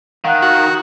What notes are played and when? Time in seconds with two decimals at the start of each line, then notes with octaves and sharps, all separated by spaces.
0.24 D#3 F5 F#5 F#6
0.42 F#4